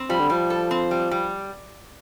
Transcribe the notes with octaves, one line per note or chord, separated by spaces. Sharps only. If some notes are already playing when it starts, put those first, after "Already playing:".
Already playing: C4
F3 G3
D3
F3 G3
A4
C4
G3
G3